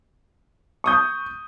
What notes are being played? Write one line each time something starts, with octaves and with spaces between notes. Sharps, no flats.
C#6 D#6 G6